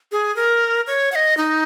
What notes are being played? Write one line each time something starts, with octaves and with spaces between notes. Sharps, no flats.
G#4
A#4
C#5
F#5
D#5
D#4